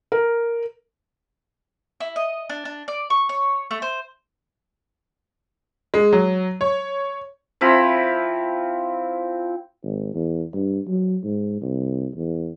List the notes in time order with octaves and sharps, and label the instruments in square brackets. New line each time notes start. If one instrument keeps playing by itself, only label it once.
[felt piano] A#4
[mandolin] E4
D#5
D4
D4
D5
C#6
C#5
A3
C5
[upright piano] G#3
F#3
C#5
[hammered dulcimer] F3 C4 E4 B5
[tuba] G#1
E2
G2
F#3
G#2
C2
E2